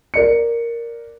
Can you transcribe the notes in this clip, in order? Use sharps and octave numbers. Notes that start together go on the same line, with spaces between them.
A#4 D5 C#7